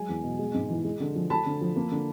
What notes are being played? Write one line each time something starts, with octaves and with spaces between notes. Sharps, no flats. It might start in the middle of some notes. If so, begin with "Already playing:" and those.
Already playing: F#3 G#3 G#5
E2
B2
G#3
G#2
E3
G#3
D3
F3
A3 A5 B5
D3
F3
A#3
D3